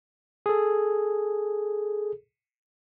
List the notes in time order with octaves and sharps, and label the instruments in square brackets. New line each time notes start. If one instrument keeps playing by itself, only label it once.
[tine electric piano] G#4 A4